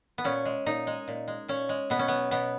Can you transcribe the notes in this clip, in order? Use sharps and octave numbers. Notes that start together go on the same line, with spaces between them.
B3
A#2 C#4
G#3
A#2 D#4
G#3
A#2
G#3
A#2 C#4
G#3
B2 B3
C#4
F#3 B3
B2 B3